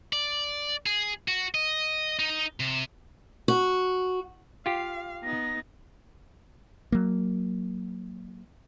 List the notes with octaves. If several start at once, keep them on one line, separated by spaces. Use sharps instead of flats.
D5
G#4
F#4
D#5
D#4
C3
F#4
F4 G4 F5
B3 D#4 A#6
F#3 A#3